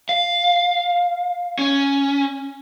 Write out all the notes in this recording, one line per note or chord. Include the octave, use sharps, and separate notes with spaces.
F5
C#4